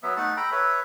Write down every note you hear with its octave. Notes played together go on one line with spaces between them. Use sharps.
F#3 B3 E5
A3 D#4 F#5 A5
A4 G5 A#5 B5
A4 B4 C#5 E5